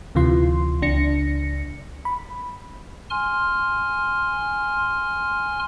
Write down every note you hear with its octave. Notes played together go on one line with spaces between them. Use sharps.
D2 C3 E3 F4 C6
C#2 D4 A#6 C#7
B5
G#5 C6 F6